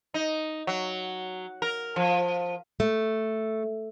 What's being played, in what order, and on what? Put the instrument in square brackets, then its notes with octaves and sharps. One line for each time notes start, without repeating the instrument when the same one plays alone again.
[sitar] D#4
F#3
A#4
F3
[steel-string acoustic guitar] A3